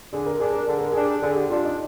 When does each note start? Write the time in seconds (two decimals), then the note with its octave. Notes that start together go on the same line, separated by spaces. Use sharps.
0.13 D3 G#4
0.26 A#4
0.40 G3 D4 G#4
0.53 A#4
0.66 D3 G#4
0.79 A#4
0.92 G3 D4 G#4
1.22 D3 G#4
1.36 G4
1.50 G3 D4 F4
1.63 D#4